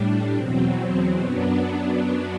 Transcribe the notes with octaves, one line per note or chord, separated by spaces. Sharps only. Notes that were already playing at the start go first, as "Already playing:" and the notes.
Already playing: A2 G3 D4
E2 B2 F#3 C4
F#2 F#3 B3 D4